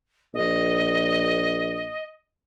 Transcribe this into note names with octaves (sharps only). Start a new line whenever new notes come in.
A#1 D#5